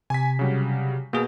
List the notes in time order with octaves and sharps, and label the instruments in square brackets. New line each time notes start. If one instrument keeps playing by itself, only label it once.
[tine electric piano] C3 [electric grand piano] G#5 B6
[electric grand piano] C#3 F#3 G3
[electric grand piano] B2 [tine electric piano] A#3 G#4